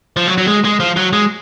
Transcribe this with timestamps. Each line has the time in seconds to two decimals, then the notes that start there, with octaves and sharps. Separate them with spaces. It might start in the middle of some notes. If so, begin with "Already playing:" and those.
0.17 F3
0.27 F#3
0.38 F#3
0.47 G#3
0.65 G#3
0.80 F3
0.96 F#3
1.13 G#3